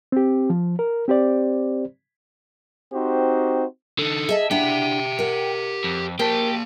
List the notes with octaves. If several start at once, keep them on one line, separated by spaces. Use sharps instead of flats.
C4 G4
F3
A#4
C4 G4 C5 D5
C4 D#4 F#4 G4 C5
D3 D#4 A4
G#4 D#5 E5 A5
D4 E4 G4 E5 F#5 G5
A#4 F#5
F2
A#3 G4 A#4 C5 A5